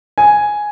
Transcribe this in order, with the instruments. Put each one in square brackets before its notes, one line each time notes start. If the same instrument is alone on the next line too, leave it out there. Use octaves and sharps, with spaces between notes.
[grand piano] G#5